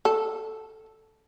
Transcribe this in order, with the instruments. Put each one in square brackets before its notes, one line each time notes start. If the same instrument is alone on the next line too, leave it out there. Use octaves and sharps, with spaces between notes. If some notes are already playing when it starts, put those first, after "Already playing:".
[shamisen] A4